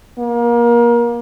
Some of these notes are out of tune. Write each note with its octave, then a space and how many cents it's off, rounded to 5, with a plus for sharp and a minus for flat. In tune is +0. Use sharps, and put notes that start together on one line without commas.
A#3 +30